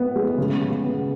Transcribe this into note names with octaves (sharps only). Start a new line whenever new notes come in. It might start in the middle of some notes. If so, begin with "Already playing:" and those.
Already playing: A2 B3
G#3
C#3
C#3
B3